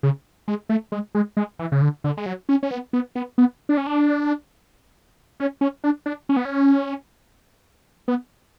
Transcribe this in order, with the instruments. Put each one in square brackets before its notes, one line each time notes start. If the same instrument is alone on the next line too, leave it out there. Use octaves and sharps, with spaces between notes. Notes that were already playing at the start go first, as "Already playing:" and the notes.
[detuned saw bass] C#3
G#3
A3
G#3
G#3
G#3
E3
C#3
D3
D3
G#3
F#3
C#4
C#4
B3
B3
B3
B3
D4
C#4
D4
C#4
C#4
D4
D4
C#4
B3
C#4
B3